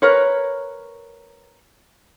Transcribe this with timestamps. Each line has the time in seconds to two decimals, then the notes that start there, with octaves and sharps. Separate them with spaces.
0.02 A#4 B4 C#5